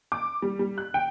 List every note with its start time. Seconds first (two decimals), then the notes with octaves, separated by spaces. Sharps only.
0.12 D6
0.42 G3
0.59 G3
0.78 F#6
0.94 G5